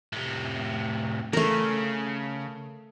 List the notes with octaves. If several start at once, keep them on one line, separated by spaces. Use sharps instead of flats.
A2 C3
C#3 A3 A#4